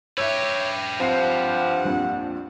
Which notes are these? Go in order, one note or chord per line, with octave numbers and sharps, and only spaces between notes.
G4 B4 C#5 E5 E6
G2 F3 C4 F#5 C7
A#1 F2 A#2